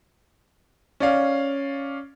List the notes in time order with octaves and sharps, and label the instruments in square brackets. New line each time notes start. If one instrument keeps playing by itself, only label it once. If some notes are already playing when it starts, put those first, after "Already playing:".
[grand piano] C#4 D5 F5